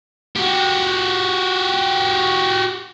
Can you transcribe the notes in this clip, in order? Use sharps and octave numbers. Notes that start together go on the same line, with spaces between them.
F#4 G4